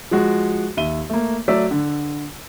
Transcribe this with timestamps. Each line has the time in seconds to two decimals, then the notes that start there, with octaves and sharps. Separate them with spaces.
0.11 F3 G#3 F#4
0.77 D#2 E5 D#7 G7
1.10 A3 A#3
1.48 F#3 A3 D5 E6 B6
1.71 D3